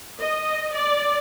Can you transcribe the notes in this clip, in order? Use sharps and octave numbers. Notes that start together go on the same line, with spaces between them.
D#5
D5